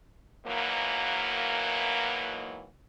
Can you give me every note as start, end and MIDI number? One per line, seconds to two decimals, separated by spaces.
0.46 2.67 44
0.46 2.67 47
0.46 2.67 52
0.46 2.67 54
0.46 2.67 58